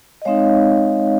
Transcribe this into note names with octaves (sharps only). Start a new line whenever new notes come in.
D#5
G#3 C4 D#4 C#5 F5